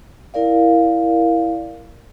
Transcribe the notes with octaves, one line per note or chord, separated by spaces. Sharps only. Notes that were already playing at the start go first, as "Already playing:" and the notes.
E4 A#4 D5 F5